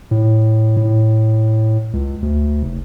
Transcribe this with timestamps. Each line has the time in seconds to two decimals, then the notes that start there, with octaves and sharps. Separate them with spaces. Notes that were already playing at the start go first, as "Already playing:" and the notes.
0.11 A2
0.77 A2
1.93 C#2
2.22 D2
2.63 F1